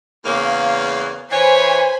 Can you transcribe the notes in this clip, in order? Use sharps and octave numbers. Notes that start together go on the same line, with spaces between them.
E2 C#3 A#3
E3 C5 C#5 G#5 B5